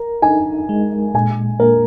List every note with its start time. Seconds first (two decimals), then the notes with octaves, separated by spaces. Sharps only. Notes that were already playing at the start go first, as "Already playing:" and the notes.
Already playing: A#4 A#5
0.22 D#4 G#5
0.69 G#3
1.14 A#2 G#5
1.60 A#3 A#4